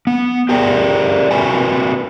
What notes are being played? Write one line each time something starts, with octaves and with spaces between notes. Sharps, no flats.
B3
G4 G#4 A#4 D5 F#5 G5
C4 F#4 A#4 B4 E5 G#5